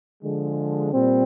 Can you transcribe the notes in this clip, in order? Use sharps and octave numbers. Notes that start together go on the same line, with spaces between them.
D3 F3 G#3
A#2 G3 C4